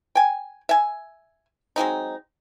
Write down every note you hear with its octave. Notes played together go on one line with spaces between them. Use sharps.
G5 G#5
E5 G#5
F#3 G#3 C4 D#4